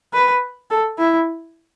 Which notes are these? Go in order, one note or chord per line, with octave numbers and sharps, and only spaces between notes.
B4
A4
E4